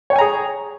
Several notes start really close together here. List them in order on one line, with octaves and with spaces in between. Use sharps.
C#5 G5 G#5 A#5 G#4